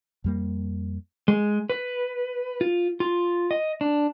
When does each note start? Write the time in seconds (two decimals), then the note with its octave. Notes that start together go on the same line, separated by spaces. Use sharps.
0.24 F2 G3 A#3
1.28 G#3
1.70 B4
2.61 F4
3.00 F4
3.51 D#5
3.81 D4